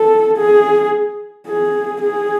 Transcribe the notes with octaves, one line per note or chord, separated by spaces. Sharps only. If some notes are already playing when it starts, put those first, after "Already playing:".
Already playing: A4
G#4
G#4
G#4